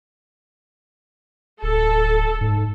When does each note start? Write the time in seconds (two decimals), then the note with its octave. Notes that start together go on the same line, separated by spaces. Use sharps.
1.63 D1 A4
2.41 G#2